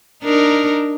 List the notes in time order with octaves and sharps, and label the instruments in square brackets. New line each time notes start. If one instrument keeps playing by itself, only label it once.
[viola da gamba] D4 D#4 A#4